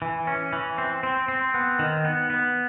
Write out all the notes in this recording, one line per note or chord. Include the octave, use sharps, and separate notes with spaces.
E3
C#4
E3
C4
C4
C4
B3
D#3
B3
B3